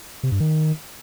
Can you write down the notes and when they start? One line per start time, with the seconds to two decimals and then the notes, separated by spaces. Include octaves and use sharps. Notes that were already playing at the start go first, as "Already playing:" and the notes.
0.23 C3
0.32 G2
0.40 D#3